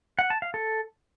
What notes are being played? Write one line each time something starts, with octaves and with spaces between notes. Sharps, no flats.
F#5
A5
F5
A4